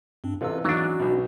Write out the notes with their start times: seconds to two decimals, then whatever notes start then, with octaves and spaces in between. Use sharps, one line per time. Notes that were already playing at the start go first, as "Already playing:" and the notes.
0.24 G2 C4 D4
0.41 A1 C3 F4 A4 B4 E6
0.64 E2 G#2 F#3 C#4 D4 F#4
0.99 B1 B2